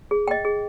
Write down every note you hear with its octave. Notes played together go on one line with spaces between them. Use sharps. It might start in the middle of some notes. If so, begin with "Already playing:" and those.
G#4
D#5 G5
G#4